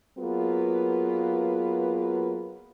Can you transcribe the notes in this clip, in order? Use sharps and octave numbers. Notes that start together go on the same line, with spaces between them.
F#3 A#3 B3 F4 G#4 B4